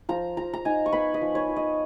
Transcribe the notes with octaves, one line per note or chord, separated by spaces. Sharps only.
F3 A#5
F3 A#5
A#5
D#4 G#5
C#6
B3 B5
D#5
F3
C#5
F3
D#5